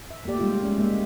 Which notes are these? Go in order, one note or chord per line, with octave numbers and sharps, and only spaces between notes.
E5
A3 A#3 G4 D5
G3 G#3 A#3 D#4 F4 G4
G#3 C#4
G#3 A#3 E5